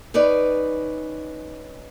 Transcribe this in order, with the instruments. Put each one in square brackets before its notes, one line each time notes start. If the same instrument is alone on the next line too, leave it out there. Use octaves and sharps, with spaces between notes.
[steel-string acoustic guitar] C#4 D#4 B4 D5